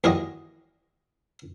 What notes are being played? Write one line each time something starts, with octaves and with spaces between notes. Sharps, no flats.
D#2 E3 G3 E4 F#4 D#5